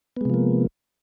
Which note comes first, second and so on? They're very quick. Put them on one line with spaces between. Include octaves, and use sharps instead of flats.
B3 G#3 C3 F3 A#3